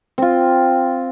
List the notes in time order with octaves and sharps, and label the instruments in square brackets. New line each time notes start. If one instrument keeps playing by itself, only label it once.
[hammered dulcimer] C4 F4